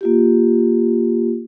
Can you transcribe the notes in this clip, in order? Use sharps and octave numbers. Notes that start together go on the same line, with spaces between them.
A#3 F4 G4